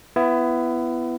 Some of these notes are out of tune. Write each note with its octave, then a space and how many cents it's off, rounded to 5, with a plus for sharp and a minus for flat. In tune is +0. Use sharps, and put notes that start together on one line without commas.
B3 +10 E4 +25